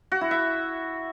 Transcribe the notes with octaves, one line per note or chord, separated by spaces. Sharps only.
F#4
E4
E5